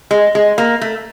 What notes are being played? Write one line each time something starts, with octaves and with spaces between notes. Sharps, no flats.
G#3
G#3
A#3
A3